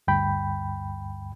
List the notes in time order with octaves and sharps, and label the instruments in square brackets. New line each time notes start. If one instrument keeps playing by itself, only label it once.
[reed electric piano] D2 G2 G5 B5